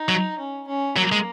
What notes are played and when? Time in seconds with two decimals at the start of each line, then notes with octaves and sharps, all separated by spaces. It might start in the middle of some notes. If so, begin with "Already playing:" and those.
Already playing: D#4
0.08 F#3
0.39 C#4
0.68 C#4
0.96 F#3 A#3
1.12 G#3